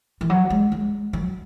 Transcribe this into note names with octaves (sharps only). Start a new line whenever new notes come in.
E3
F#3
G#3
G#3
F#3